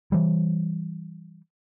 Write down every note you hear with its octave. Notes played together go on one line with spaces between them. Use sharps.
E3 G3